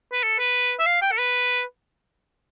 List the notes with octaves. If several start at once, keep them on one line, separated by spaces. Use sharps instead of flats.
B4
A4
B4
E5
F5
G5
A4
B4